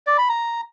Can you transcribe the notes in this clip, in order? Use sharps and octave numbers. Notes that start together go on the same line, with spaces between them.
D5
B5
A#5